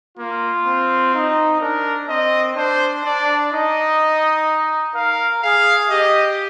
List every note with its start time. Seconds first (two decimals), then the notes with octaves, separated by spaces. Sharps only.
0.18 A#3 F4
0.66 C4
1.14 D#4
1.61 D4 A#4
2.09 C4 D#5
2.56 D4 C5
3.04 D4 D5
3.51 D#4 D#5
4.95 A#4 F5
5.43 G#4 F5
5.90 G4 D#5